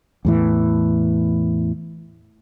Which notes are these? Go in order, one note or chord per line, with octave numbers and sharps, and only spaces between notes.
E2 A2 E3